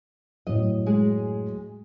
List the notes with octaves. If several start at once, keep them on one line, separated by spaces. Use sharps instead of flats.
F#2 A2 D#5
G#3 G#4